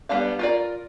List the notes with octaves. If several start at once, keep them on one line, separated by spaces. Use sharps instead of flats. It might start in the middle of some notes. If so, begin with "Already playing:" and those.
G3 B3 D4 F5
F4 A#4 D5